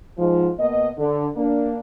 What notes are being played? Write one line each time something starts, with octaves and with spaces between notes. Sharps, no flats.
G#2 F3
B2 A#3 B3 D#5
D3
A#3 D4